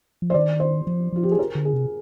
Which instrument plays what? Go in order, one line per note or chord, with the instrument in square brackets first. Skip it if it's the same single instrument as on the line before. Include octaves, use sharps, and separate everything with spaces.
[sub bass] F3
[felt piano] C5
[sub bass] D#3 [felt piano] D5
[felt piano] C5
[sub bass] F3
[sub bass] F3 [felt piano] F4
[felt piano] G4
G#4
A#4
[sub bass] D3
[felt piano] G#4
[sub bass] C3